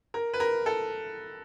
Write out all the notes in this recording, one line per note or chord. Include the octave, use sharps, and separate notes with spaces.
A#4
B4
A#4
A4